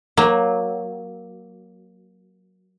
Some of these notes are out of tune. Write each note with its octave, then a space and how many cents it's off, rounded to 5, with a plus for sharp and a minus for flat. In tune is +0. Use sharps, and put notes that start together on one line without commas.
F#3 +0 A#3 +10